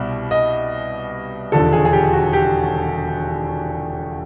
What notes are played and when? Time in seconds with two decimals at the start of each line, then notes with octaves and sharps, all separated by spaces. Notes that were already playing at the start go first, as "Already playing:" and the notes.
Already playing: C2 B2 G3
0.31 D#5
1.52 E1 D#2 D3 F3 A4
1.73 G#4
1.85 G#4
1.93 G4
2.13 F#4
2.33 G4